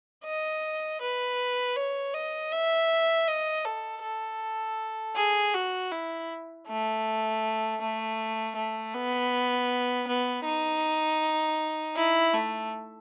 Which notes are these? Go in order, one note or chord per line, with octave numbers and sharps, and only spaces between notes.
D#5
B4
C#5
D#5
E5
D#5
A4
A4
G#4
F#4
E4
A3
A3
A3
B3
B3
D#4
E4
A3